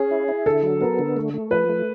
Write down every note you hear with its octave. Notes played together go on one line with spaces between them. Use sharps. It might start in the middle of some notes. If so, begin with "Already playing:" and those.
Already playing: C#4 G#4
E4
E4
D3 A4
F#3
B3 A#4
D3
A3
A3
F3 B4
A3